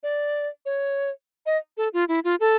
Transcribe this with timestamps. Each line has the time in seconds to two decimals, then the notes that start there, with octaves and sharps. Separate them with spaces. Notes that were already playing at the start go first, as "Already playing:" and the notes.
0.03 D5
0.66 C#5
1.46 D#5
1.77 A4
1.93 F4
2.08 E4
2.24 F4
2.40 A4